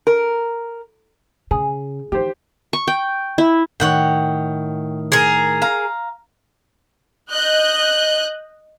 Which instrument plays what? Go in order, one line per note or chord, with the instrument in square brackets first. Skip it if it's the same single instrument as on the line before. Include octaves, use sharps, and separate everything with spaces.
[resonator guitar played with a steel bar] A#4
[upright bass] C#3 [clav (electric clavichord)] G#4
[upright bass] E3 D#4 [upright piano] G4 C5
[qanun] C#6
G5
E4
[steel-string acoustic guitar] A2 D#3 [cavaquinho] C#5 F#5 G5
[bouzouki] G#4 A#4
[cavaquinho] F5 A#5
[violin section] D#5 F#6 G6